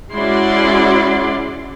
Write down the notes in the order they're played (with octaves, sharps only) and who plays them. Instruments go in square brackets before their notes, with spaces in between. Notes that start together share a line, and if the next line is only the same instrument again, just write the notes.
[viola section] G#3 C#4 E4 F#4 D5 C6